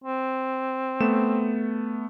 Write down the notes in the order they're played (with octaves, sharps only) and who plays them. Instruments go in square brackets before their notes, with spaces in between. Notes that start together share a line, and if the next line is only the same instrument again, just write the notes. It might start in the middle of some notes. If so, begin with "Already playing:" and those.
[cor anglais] C4
[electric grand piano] A3 B3 E7